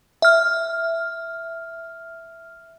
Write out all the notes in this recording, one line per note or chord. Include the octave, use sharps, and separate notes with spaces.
E5 F6